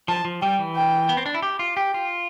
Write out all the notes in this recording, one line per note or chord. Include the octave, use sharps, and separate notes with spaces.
F3 A5
F3
G3 G5
E3
G5
B3
C4
D4
E4
G4
F4
G4 G5
F4